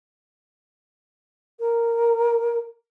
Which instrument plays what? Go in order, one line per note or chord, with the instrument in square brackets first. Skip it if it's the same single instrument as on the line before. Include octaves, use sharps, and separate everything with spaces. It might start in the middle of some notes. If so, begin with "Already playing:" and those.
[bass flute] A#4